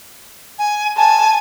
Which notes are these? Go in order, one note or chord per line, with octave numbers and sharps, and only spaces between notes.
G#5
G#5 A5